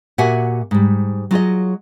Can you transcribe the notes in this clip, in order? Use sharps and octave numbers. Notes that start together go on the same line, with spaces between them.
A#2 F#4 G4 E5 F#5 G#5
G#2 G3
F#3 F4 G#4 D#5